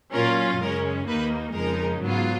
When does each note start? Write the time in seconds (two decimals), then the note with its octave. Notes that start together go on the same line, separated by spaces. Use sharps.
0.13 A#2 F#3 C#4 F4 A#4
0.59 F#2 C#3 G#3 C#4 A#4
1.07 D#2 D#3 A#3 D#4 B4
1.55 F2 C#3 G#3 D#4 A#4
2.02 G#2 F#3 B3 F4